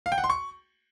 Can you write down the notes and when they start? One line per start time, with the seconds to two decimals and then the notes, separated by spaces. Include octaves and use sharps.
0.06 F5
0.12 G5
0.18 F#5
0.24 C6
0.30 C#6